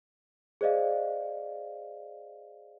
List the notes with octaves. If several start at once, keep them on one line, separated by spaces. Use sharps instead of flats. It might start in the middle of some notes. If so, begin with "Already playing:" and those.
G#4 C5 D5 D#5 F5